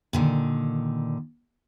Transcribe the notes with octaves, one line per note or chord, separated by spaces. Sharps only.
A#2 D3 D#3